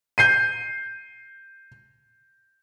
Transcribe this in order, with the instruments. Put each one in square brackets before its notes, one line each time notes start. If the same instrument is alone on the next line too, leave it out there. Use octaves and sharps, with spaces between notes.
[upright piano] G6 C7 D#7